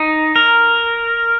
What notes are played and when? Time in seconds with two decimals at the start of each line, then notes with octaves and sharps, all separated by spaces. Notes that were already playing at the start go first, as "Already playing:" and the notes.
Already playing: D#4
0.36 A#4